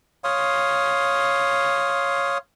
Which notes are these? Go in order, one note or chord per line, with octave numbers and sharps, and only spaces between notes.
C#5 F5 C6 D#6